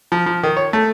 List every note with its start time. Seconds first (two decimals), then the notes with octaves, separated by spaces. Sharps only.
0.12 F3
0.26 F3
0.43 D#3
0.57 C#5
0.73 A3